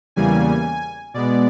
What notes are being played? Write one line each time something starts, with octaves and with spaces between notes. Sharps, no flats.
E2 C#3 E3 G3 A#3 G#5
B2 G#3 B3 D5